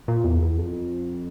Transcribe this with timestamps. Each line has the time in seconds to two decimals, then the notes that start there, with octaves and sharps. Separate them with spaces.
0.08 A#2
0.24 E2
0.42 E2
0.58 F2